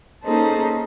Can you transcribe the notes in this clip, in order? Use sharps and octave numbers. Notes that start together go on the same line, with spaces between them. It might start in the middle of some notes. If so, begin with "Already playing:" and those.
A#3 C#4 D#4 G#4 A4 C5